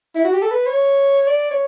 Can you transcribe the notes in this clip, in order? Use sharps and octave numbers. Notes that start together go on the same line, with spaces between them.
E4
F#4
G4
A4
B4
C#5
D5
C#5